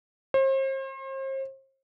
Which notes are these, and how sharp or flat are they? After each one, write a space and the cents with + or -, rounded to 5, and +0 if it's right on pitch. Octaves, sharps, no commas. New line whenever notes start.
C5 +40